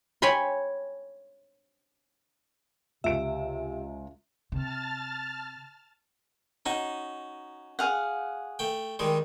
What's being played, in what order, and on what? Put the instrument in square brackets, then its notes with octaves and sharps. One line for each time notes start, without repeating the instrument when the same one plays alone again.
[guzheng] C#5 G5 G#5 B5 C6
[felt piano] C#2 D7 [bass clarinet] C3 [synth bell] E5
[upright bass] C3 [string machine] A5 F6 A6
[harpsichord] C#4 F#4 [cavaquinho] D#4
[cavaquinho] G#4 F5 F#5
[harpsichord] A3 G5
D#3 G3 G#3